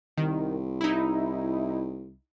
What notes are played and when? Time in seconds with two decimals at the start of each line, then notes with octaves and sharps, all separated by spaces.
0.18 C2 D#3
0.81 D#4 E4